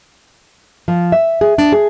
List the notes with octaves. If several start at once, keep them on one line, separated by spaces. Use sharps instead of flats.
F3
E5
G#4
D4
G#4